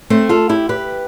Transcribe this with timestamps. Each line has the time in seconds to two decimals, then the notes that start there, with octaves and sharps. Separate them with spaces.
0.10 A3 C4
0.29 F4 A4
0.49 E4 G4
0.69 G4 B4